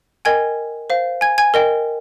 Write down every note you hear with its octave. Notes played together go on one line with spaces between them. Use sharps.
A#4 D#5 G5 G#5 G#6
C5 F5
G#5 G#6
G#5 G#6
A#4 D#5 G5